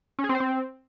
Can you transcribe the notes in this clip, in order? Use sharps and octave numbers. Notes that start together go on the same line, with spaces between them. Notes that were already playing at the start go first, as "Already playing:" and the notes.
C#4
G#4
C4
C5
C4